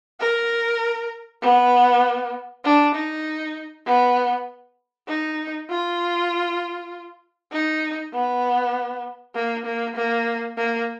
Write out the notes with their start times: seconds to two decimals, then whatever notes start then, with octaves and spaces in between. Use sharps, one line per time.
0.20 A#4
1.42 B3
2.64 D4
2.95 D#4
3.86 B3
5.08 D#4
5.70 F4
7.52 D#4
8.13 B3
9.35 A#3
9.66 A#3
9.96 A#3
10.57 A#3